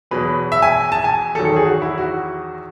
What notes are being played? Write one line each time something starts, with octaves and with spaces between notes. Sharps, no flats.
E2 B2 F#3 B4
E5
G#5
A5
G#5
E2 D#3 F#3 A4
A4
G#4
F#4
E4
F#4